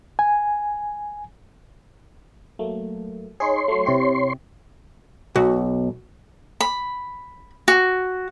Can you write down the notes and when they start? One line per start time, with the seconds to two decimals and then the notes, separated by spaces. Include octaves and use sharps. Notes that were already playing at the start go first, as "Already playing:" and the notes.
0.19 G#5
2.59 F#3 A3 A#3
3.40 D#4 G#4 C#5 C6
3.68 F#3 A3
3.86 C3 E4 G4
5.36 B1 F#4
6.60 B5
7.68 F#4